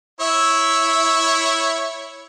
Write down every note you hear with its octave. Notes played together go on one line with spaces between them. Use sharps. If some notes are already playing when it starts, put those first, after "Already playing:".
E4 C#5 E5